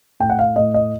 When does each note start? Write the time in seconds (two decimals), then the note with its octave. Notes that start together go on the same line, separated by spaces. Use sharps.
0.20 A2 G5
0.30 F#5
0.39 F5
0.56 A2 D#5
0.74 D#5